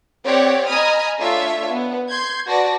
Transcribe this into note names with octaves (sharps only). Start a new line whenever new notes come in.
C4 G4 C#5 D5 F#5
D#5 G#5 A#5 B5 D#6 F6
A3 D4 F4 C#5 E5
B3
C6 G6 G#6
F#4 B4 D5 A5 A#6